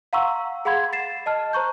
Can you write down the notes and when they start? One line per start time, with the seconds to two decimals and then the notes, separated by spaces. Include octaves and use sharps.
0.13 F5 F#5 A#5 C6 C#6 E6
0.65 G#4 F5 F#5 B5 C6 G#6
0.93 A6 C7 E7
1.26 D#5 A5 F6
1.53 C5 A#5 C#6 G6